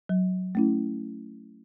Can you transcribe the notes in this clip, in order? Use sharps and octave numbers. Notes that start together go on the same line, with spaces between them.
F#3
A3 C#4 E4